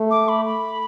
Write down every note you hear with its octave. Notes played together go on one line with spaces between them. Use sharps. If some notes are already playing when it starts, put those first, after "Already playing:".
Already playing: A3
D6
B5
B5